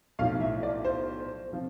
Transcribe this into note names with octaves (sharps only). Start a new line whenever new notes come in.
B1 A2 F3 F5
E5
D5
C5
C3 F3